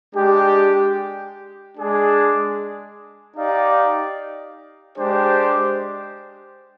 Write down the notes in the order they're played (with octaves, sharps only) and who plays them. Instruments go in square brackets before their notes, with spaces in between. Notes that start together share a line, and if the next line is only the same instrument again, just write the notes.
[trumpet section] G#3 D4 G4
G#3 D4 G#4
D#4 G4 D5 F5
G#3 D4 G4 C5